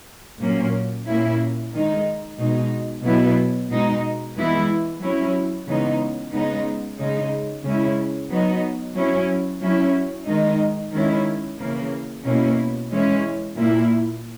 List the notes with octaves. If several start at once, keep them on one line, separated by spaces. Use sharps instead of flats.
A#2 F#3 A#3 C#4
A#2 A#3 C#4 E4
D#3 G#3 D#4
B2 G#3 D#4
B2 F#3 B3 E4
B2 G#3 D#4
E3 G#3 B3 E4
F#3 C#4 E4
C#3 E3 G#3 B3 D#4
C#3 G#3 B3 D#4
C#3 G#3 D#4
C#3 G#3 C#4 E4
F#3 B3 D#4
F#3 C#4 E4
F#3 C#4 E4
D#3 G#3 D#4
D#3 G#3 C#4 E4
C#3 E3 A#3
B2 A#3 C#4 E4
E3 G#3 C#4 E4
A#2 A#3 E4